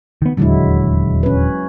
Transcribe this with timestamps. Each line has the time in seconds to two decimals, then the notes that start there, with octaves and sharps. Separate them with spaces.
0.22 D#3 B3
0.37 D#1 E2 D3 F#3 G#3 E4
1.23 C#4 B4